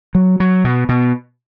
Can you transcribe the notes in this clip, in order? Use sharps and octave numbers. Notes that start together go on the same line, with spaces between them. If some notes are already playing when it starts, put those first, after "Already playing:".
F#3
F#3
B2
B2